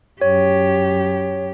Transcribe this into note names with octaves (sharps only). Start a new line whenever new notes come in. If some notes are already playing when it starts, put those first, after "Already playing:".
F#2 G4 C#5